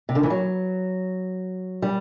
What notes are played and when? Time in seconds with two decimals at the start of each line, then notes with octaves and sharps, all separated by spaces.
0.09 C3
0.15 D3
0.23 E3
0.30 F#3
1.82 G3